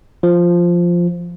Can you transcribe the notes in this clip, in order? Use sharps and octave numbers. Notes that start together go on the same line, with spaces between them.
F3